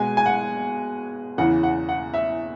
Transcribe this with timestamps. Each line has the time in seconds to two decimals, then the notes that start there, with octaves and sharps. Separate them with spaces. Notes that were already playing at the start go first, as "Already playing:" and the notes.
Already playing: B2 G#3 B3 G#5
0.17 G#5
0.26 F#5
1.38 E2 C#3 E3 F#5
1.63 F#5
1.89 F#5
2.14 E5